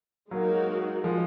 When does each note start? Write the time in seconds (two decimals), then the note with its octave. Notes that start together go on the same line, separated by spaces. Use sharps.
0.31 F#3 G#3 A#3 D#4 F#4 A#4
1.04 F3 G#3